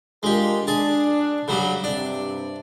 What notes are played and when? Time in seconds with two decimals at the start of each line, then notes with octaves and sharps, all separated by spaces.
0.23 G#3 D4 F4 G4 A#4
0.67 D4 G#4 A5
1.48 C#3 F#3 G3
1.84 G2 C3 D4